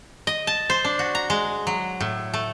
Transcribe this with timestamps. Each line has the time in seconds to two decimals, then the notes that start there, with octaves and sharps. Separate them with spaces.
0.27 D#5
0.47 A5
0.70 C5
0.85 D4
0.99 F#4
1.15 A#5
1.30 G#3
1.67 F#3
2.00 A2
2.34 A3